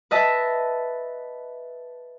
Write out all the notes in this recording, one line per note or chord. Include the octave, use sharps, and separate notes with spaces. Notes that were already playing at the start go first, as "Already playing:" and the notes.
B4 D#5 E5 A5